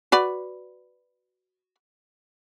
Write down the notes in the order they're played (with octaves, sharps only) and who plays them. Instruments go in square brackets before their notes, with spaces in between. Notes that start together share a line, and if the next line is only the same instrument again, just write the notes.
[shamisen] F#4 B4 D5